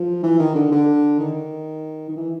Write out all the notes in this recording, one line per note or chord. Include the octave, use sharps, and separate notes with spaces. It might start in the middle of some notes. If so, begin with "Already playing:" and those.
Already playing: F3
E3
D#3
D3
D3
D#3
D#3
E3